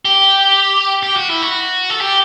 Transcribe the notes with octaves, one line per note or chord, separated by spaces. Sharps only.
G4
G4
F#4
E4
F#4
A4
G4